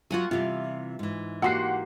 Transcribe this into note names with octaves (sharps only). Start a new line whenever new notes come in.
F#3 A#3 F4 F#4 F#5 G#5
C3 E3 G3 F4
G#2 E3
A#3 F#4 G4 F#5 C6 C7